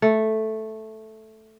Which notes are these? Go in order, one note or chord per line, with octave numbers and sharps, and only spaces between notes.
A3